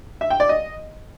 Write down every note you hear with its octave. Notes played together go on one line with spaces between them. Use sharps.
E5
G5
D5
D#5